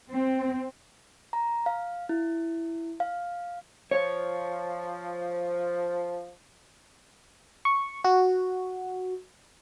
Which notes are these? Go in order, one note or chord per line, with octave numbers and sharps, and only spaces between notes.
C4
A#5
F5
E4
F5
F3 C#5
C#6
F#4